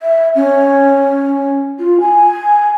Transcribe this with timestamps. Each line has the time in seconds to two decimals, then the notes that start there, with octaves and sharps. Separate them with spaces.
0.01 E5
0.35 C#4
1.79 F4
2.00 G#5